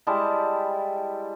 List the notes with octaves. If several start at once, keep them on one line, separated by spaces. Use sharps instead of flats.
G3 G#3 E4 A5